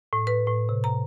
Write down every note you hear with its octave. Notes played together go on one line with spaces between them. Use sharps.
A2
B4
A2
C3
A#5